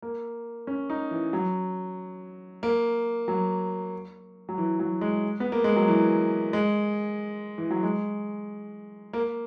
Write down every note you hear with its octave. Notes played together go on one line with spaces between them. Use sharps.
A#3
C#4
D#4
E3
F#3
A#3
F#3
F#3
E3
F#3
G#3
B3
A#3
G#3
F#3
E3
G#3
E3
F#3
G#3
A#3